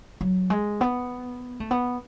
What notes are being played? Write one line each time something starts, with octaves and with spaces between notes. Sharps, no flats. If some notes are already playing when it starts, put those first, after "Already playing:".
F#3
G#3
B3
A3
B3